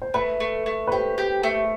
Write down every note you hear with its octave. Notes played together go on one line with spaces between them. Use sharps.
C5
A3 B4
A3
A3
B4
G4 C5
G4
A3